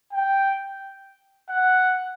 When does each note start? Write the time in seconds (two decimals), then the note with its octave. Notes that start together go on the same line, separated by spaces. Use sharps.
0.13 G5
1.49 F#5